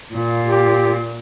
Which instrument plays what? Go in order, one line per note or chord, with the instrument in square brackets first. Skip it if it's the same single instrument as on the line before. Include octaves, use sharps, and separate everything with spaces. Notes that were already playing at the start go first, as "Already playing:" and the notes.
[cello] A#2
[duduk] G4